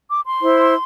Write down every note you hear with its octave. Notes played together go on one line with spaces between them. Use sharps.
D6
C6
E4 C5